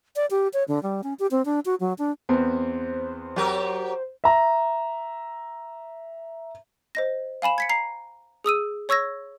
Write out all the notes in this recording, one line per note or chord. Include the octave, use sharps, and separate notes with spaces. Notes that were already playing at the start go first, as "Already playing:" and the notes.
D5
G4
C#5
D3
G3
C#4
G4
C4
D4
F#4
F#3
D4
E2 B3 C4 C5
F#3 G4 A#4
E5 A#5
C5 D#5 A#6
F5 G#5 B5 E7
G#6 B6 C#7
A#5 C7
G#4 D#6 E6 D#7
C#5 C#6 E6 G#6 A#6